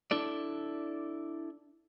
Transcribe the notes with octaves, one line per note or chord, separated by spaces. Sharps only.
D4 E4 A4 D5